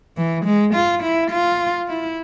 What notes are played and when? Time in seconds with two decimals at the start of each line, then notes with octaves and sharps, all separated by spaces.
0.17 E3
0.45 G#3
0.74 F4
1.03 E4
1.31 F4
1.88 E4